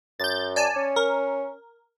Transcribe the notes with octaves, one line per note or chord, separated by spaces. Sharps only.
F#2 G6 A6
D5 G#5 A5
C#4
A#4